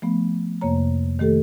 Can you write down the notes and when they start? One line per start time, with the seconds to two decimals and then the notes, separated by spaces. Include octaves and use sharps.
0.02 F3 A3 B3
0.61 F2 C3 A#3 C#5 A#5
1.19 D#3 A3 G4 A4